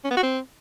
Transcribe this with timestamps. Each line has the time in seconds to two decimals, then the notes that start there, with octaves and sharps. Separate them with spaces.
0.04 C#4
0.11 B3
0.17 F#4
0.23 C4